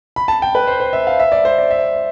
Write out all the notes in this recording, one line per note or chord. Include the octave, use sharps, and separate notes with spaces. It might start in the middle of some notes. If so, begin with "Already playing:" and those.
B5
A5
G5
B4
C5
C5
E5
F5
E5
D5
C5
D5
E5